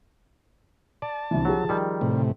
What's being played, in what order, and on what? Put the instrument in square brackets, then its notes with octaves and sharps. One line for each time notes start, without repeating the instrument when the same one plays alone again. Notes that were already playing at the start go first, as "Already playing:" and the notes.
[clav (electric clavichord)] D5 [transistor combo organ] A5
[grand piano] C2 D3 E3
[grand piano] F3 G4 G#4 [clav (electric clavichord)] F#3
[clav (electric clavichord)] D#3 G3
[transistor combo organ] A2 C3